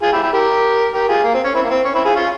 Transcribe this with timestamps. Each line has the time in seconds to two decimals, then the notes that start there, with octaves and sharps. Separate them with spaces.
0.02 F4 G#4
0.12 E4 G4
0.23 E4 G4
0.33 G4 A#4
0.93 G4 A#4
1.09 F4 G#4
1.24 A#3
1.34 C4
1.44 C#4
1.54 C4 E4
1.63 A#3
1.70 C4
1.85 C#4
1.95 C4 E4
2.05 F4 G#4
2.15 C#4 F4